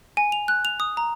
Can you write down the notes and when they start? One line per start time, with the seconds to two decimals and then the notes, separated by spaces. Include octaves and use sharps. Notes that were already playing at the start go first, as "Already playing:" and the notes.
0.17 G#5
0.32 F7
0.48 F#6
0.65 F7
0.80 D#6
0.97 A#5